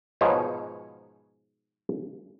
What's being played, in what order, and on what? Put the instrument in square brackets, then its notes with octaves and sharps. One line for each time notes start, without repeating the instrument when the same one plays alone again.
[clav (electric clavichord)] G#2 B2 F3 D#4 C#5 G#5